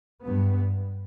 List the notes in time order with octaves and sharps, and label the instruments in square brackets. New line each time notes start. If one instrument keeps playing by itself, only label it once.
[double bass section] G2 B3